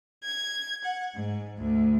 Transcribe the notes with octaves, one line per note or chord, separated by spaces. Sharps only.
G#6
F#5
G#2
D2